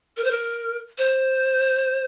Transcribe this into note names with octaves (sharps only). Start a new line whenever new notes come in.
A#4
C5
A#4
C5